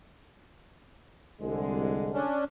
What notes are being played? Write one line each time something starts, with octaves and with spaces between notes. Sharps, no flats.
C2 D3 G#3
C#4 D4